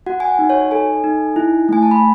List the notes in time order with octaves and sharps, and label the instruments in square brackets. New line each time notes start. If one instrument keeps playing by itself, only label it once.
[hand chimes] F#4 F#5
G#5
F#5
D#4
C#5
A4 G#5
D#4
E4
A3 G#5
A5
B5